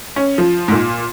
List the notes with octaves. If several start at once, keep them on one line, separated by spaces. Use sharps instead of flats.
C#4
F3
G#2
A#2